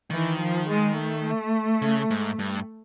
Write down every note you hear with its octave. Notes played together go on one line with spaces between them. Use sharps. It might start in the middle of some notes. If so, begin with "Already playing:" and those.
D#3 E3
F3
G#3
A3
C#3
G#2
G2